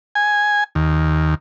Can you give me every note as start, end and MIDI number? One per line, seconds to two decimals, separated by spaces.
0.15 0.64 80
0.75 1.35 39